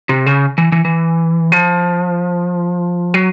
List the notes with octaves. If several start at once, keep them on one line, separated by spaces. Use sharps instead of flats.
C3
C#3
E3
E3
E3
F3
F#3